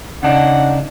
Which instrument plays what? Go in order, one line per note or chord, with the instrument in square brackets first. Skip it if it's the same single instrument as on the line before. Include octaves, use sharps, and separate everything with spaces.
[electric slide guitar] C#3 D4 D#4 [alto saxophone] F#5